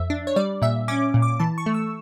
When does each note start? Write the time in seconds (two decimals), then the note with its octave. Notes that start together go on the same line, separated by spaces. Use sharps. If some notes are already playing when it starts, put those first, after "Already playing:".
Already playing: F2 E5
0.10 D4
0.27 C#5
0.36 G3 D5
0.62 A#2 E5
0.88 C#4 D6
1.14 A#2
1.22 D6
1.39 E3 A5
1.58 C#6
1.66 A3
1.74 E6